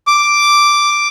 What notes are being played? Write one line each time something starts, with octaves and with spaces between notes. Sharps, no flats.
D6